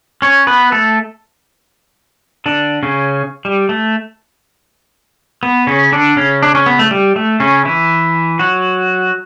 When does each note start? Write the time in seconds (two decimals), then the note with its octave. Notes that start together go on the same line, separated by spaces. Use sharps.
0.22 C#4 C#5
0.47 B3 B4
0.72 A3 A4
2.46 D3 D4
2.83 C#3 C#4
3.45 G3
3.69 A3
5.43 B3
5.67 C#3 C#4
5.92 D3 D4
6.16 C#3 C#4
6.43 D4
6.55 C#4
6.66 B3
6.79 A3
6.91 G3
7.16 A3
7.40 C#3 C#4
7.65 E3 E4
8.39 F#3 F#4